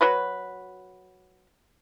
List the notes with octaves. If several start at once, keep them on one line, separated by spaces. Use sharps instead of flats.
F#3 F#4 B4